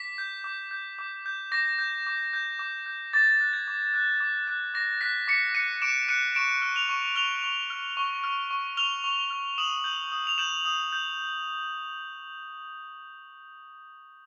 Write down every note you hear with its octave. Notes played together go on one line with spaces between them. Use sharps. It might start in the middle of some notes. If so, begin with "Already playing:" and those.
Already playing: D6 B6
G6
D6
G6
D6
G6
D6 A#6
G6
D6
G6
D6
G6
D6 A6
F#6
G#6
D6
F#6
D6
F#6
D6 A#6
F#6 B6
D6 B6 C#7
F#6 C#7 D#7
D6 D7 E7
F#6 C#7 D#7
C#6 D7 E7
F6
D#7 F7
C#6
F6 F7 G7
C#6
F6
C#6
F6
C#6
F6 F7 G7
C#6
F6
D#6 E7 F#7
G6
D#6
F7
G6 E7 F#7
D#6
G6